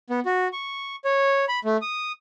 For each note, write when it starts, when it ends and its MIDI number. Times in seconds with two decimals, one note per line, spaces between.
0.10 0.20 59
0.26 0.48 66
0.53 0.96 85
1.05 1.45 73
1.48 1.59 83
1.65 1.77 57
1.82 2.12 87